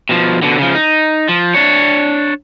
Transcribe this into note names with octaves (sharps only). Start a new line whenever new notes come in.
B2 F3
B2 D3
C#3 F3
D#4
F3
D4 C#5